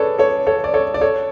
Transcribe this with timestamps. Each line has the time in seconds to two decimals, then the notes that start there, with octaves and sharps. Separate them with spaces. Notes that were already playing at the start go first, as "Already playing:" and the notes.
Already playing: G#4 A4 B4 C#5 D5
0.19 A4 C#5
0.47 A4 C#5
0.64 D5
0.74 A4 C#5
0.94 D5
1.01 A4 C#5